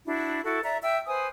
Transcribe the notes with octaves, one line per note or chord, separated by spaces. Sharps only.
D4 E4 F#4
E4 F#4 A4
D5 E5 A#5
E5 G5 E6
B4 C5 G#5 D#6